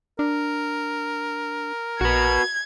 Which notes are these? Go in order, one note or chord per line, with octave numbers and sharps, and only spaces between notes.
D4 A#4
A#1 F#4 B4 G#6